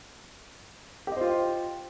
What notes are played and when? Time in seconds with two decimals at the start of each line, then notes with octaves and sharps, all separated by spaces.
1.07 G4
1.12 D#5
1.17 C5
1.21 F4